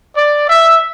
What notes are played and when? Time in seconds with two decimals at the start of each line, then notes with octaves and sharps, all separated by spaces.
0.14 D5
0.47 E5